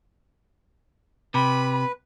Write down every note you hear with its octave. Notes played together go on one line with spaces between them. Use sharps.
C3 B4 B5